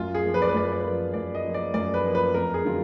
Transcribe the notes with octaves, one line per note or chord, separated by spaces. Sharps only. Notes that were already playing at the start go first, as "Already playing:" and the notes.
Already playing: F#2 F4
G#4
F3 A#3
B4
D5
B4
F#2 D5
B4
D5
F3 A#3 B4
F#2 D5
D#5
F3 A#3
D5
F#2 D5
B4
F3 A#3
B4
F2 A#4
G#4
D3 F#3 B3 F4